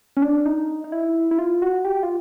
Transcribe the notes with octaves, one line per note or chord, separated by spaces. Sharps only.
C#4
D4
D#4
D#4
E4
E4
F4
F#4
G4
F4